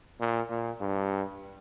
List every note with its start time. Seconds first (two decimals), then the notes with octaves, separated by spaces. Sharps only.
0.20 A#2
0.50 A#2
0.80 G2